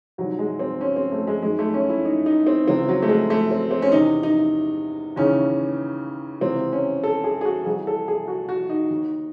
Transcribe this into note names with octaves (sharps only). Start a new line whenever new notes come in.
C2 C3 D#3 F#3
G#3
C4
C#4
C4
A3
G#3
F#2 D#3 G#3
A3
C#4
E4
D#4
D#4
C4
C#2 C#3 E3 C4
F#3
A3
G#3
A3
C4
C4
C#4
E2 C3 D#3 D#4
D#4
D#2 C#3 E3 C#4
C#2 C3 E3 C4
C#4
A4
G#4
G#4
F#4
C2 C3 E3 G#4
A4
G#4
F#4
F#4
D#4
D#2 D#3